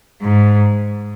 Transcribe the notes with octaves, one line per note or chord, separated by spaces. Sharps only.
G#2